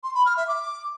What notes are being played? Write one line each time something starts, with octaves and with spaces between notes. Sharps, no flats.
C6
B5
F6
E5
D6